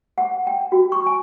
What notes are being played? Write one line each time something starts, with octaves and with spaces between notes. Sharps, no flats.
F#5
G5
F#4
C#6
G#5